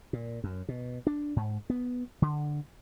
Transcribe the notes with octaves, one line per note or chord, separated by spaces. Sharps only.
A#2
F#2
B2
D4
G#2
B3
D3